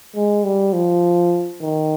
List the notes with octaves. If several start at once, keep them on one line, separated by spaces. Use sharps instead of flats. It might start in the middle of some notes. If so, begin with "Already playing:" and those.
G#3
G3
F3
D#3